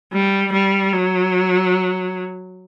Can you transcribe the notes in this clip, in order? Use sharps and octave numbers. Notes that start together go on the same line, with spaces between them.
G3
G3
F#3